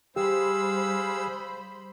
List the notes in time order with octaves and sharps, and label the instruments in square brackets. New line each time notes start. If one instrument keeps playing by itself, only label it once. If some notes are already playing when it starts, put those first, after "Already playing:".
[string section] G3 C5 B5 [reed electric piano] G4 [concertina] G#4 F5 [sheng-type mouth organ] E6